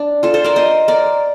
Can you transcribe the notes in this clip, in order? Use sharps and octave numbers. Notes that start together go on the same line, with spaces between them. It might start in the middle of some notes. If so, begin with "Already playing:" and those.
Already playing: D4
F4 A4
A4 C5
A#4 D5
C5 D#5
A#4 D5